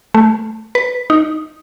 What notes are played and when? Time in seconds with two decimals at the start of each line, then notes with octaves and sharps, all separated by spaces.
0.14 A3
0.75 B4
1.10 D#4